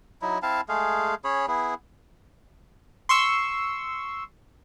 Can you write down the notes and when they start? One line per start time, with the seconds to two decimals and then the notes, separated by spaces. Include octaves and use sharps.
0.22 F#3 D#4 E4
0.42 C4 E4 F5 A5
0.69 G#3 A3 G#4 F5
1.24 C#4 G#4 C#5 B5
1.48 B3 E4 G#4
3.09 C6 C#6 E6